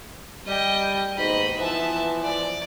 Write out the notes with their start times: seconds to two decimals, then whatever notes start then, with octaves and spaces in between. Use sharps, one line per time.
0.46 G3 D#5 G5
1.16 D#2 G#2 B2 D#5 B5
1.58 E3 F3 B3 E5 A5
2.23 D5